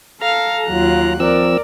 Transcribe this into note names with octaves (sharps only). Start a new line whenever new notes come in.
A4 F5 A#5
D#2 F#3 F4 F#6
F3 C4 A#4 D5 E6